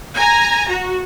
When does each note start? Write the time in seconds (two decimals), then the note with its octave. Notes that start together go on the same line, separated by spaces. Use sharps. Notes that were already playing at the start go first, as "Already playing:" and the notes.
0.16 G#5 A#5
0.69 F#4